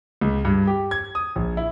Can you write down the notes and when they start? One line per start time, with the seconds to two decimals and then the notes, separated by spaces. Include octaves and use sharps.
0.21 C#2
0.45 G2
0.67 G4
0.91 G#6
1.15 D#6
1.36 A#1
1.57 E4